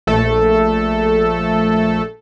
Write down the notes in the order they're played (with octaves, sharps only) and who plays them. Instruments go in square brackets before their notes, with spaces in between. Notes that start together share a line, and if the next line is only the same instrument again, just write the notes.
[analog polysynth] A#1 A3 A4